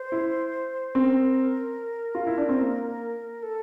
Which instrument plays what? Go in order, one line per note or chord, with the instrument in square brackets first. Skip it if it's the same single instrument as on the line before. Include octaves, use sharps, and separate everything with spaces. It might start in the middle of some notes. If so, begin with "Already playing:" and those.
Already playing: [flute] C5
[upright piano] E4
[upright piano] C4 [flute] A#4
[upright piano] F4
E4
D4
C4
A#3
[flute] A4